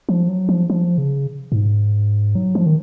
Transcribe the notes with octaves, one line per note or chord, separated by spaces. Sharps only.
F3
F#3
F3
F3
C#3
G#2
F#3
F3
D#3